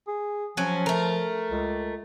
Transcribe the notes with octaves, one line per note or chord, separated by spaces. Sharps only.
G#4
F3 F#3 C#4
A3 A#4
C#2